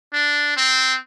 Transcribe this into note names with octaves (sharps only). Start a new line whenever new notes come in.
D4
C4